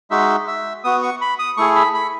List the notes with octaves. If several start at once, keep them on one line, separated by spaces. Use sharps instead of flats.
G#3 D#4 F#4 E5
E5
B3 F#4 D#6
C#6
B5
D#6
A3 E4 G#4 C#6
B5
B5